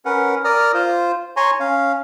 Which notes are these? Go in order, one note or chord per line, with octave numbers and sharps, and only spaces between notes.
C#4 A#4 B4 F#5
A#4 D5 A#5 D#6 F6
F4 C5
C#5 G#5 A#5 C6 C#6
C#4 F5